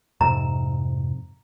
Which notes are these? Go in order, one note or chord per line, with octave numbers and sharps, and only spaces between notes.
F2 G#2 C3 A#5